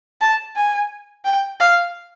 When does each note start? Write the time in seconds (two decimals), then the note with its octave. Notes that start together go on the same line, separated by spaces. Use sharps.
0.21 A5
0.56 G#5
1.25 G5
1.60 F5